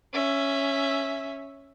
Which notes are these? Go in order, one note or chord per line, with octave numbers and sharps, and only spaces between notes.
C#4 E5